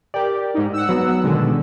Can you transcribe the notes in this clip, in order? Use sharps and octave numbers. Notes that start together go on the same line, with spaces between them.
G4 A#4 D5
G#2 D#4
F#5 E6
F#3 B3 F#4
B2 D3 D#3 G#3